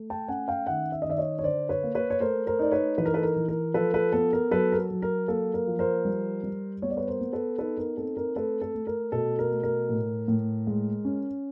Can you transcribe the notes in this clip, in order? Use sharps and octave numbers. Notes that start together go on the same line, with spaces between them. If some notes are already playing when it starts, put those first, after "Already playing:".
Already playing: A3
G5 A5
C#4 F#5 G#5
F5 G5
D#3 E5 F#5
E5
D#5
D#3 D5 E5
C#5 D#5
C#5
D3 C5 D5
B4 C#5
A#3
B4 C#5
C#5
A3 A#4 C5
A#4 C5
D#4 D5
B4 C#5
E3 B4
A#4
A4 B4
A#4
E3
A#4
F3 A4 B4
A4 B4
B3 A4
A#4
F#3 A4 B4
A#4
A4
F#3
A#4
A#3 A4
A#4
F3
A#4 C5
G3
G3
B3 C#5
D5
B4 C#5
A#4 C5
B3
A4 B4
D#4 A4 B4
A#4
C4 A4
A#4
A3 A4 B4
A4
A3
A#4
B2 A4
A#4
A3
A#4
A2
A2
G#3
C#4